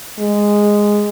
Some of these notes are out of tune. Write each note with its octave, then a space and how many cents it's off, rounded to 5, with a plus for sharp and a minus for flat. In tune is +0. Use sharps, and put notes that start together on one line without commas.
G#3 -5